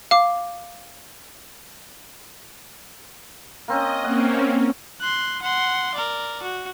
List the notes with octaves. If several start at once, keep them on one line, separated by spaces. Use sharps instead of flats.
F5 D6
A#3 C4 C#4 D#5
A#3 C4 C#4 F#5
C6 F#6
F#5 C6
A#4 D5
F#4